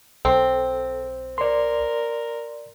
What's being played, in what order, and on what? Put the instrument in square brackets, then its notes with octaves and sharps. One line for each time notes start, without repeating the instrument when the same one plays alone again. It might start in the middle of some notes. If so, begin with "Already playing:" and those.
[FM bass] B1 [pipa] C4 [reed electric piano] A4
[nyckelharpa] A#4 [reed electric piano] D5 C6